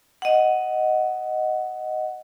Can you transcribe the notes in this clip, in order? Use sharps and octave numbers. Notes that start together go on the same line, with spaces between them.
D#5 F#5